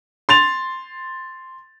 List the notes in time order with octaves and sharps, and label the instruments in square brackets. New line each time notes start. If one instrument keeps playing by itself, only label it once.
[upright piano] C6 A6 F7